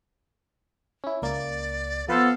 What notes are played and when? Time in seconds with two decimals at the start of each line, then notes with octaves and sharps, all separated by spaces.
1.04 C#4 E4
1.22 C#2 A#3 D5
2.09 F3 B3 A4 B4 C5 F5